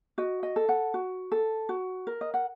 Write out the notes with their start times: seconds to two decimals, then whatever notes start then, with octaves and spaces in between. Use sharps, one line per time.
0.18 F#4 D#5
0.43 D#5
0.56 A4
0.69 F#5
0.94 F#4
1.32 A4
1.69 F#4
2.07 A#4
2.21 D#5
2.34 F#5